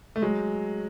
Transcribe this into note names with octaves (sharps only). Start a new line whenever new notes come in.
A3
F#3 G#3